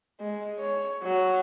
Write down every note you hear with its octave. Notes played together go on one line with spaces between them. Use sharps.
G#3
C#5
F#3